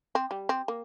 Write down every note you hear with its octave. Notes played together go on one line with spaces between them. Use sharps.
C4
G3
C4
A#3